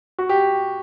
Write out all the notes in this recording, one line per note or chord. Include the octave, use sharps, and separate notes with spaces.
F#4
G4